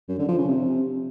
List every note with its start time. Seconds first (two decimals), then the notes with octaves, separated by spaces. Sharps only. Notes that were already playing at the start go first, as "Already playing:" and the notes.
0.08 F#2
0.18 D3
0.28 F3
0.38 C#3
0.48 C3